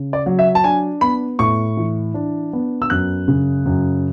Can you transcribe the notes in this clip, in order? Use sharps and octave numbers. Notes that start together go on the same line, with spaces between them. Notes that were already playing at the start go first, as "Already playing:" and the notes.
Already playing: C#3
D5
F#3
E5
A5
D4 G#5
B3 B5
A2 C#6
E3
D4
B3
E6
F#2 F#6
C#3
F#2